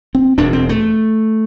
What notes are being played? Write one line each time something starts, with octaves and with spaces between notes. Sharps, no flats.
C4
E1 E2 B2 D4
C4
A3